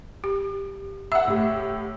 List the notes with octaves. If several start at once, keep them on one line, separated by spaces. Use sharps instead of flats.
G4
E5 F#5 E6
A2 G4